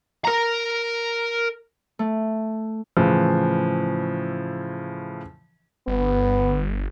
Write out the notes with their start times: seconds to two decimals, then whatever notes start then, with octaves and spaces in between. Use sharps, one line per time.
0.25 A#4 A#5
1.99 A3
2.97 A2 C#3 E3 F3
5.88 G1 B3